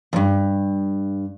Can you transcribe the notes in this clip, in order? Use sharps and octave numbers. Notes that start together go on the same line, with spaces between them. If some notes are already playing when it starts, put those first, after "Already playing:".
E2 G2